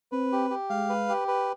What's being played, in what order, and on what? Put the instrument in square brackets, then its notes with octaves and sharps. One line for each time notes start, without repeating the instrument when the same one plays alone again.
[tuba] C4 [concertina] B4
[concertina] G4
G4
[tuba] G#3 [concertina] F5
[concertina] B4
G4
B4